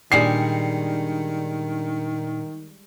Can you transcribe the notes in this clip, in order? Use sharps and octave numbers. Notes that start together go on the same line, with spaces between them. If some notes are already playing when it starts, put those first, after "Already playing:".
A#2 D#3 G3 G#3 D4 G#4 C7 C#7